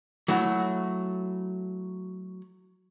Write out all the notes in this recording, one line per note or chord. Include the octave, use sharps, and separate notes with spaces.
F#3 A3 E4 F#4